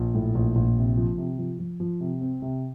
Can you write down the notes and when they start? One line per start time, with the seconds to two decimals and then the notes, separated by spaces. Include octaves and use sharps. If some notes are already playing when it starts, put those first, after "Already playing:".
Already playing: A#1
0.15 A2
0.35 A#1
0.56 A#1
0.76 C3
0.97 F3
1.18 C3
1.38 F3
1.59 F3
1.80 F3
2.01 C3
2.21 C4
2.42 C3